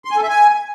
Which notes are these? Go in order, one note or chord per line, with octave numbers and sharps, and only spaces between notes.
C6
G#5
A4
E5
G#5